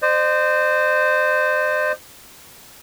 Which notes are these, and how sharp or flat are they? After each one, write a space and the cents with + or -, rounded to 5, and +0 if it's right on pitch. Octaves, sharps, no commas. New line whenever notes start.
C5 -15 D#5 -45